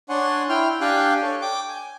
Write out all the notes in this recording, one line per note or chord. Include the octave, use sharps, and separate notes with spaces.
D4 C#5 F#5 G#5 C6
E4 G5 C6 F6
D4 G4 F5 G5 G#5 F#6
A4 C#5
G5 D6 G6
G#5